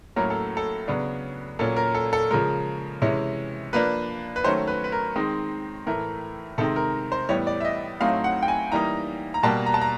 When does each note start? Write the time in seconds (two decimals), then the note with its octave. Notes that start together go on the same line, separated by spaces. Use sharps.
0.16 A2 F#3 A#3 C#4 A#4
0.30 A4
0.57 A4
0.88 C#3 F#3 B3 D4
1.59 A#2 F#3 A#3 C#4 A4
1.76 A#4
1.95 A4
2.13 A4
2.30 C#3 F3 G#3 A#4
3.02 C3 E3 G#3 C#4
3.73 F3 A#3 D4 B4
4.36 B4
4.44 D#3 F#3 A3 C#4 C5
4.68 B4
4.84 B4
4.92 A#4
5.15 D#3 G#3 C4 D#4
5.87 A2 E3 A3 A#4
6.58 C3 D#3 G#3 C4 D#4 A4
6.76 A#4
7.12 C5
7.29 A2 E3 G3 B3 C#5
7.47 D5
7.60 E5
7.65 D#5
8.00 A2 F#3 A3 C4 D#4 F5
8.24 F#5
8.43 G5
8.48 G#5
8.72 E3 G3 A#3 D#4 A#5
9.34 A#5
9.43 B2 G3 A#3 A5
9.66 A#5
9.74 A5
9.81 A#5